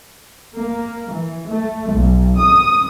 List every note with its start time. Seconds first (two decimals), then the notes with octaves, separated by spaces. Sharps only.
0.56 A#3
1.11 E3
1.48 A3
1.91 B1
2.37 D#6